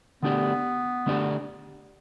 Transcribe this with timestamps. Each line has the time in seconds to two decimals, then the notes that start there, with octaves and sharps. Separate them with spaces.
0.23 D3 A3 B3 D4 G4 D5
1.06 D3 A3 D4 G4 D5